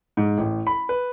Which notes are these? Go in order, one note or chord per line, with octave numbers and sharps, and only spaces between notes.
G#2
A1
B5
B4